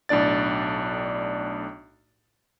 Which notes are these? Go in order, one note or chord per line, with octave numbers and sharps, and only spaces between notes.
B1 A2 D4 D5 A6